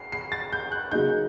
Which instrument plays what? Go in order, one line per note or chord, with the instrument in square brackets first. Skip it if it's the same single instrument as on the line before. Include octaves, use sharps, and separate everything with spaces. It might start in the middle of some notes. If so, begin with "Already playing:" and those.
Already playing: [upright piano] C7
C7
A6
G6
F#6
[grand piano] C#3 F#3 A#3 D#4 G#4 [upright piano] G6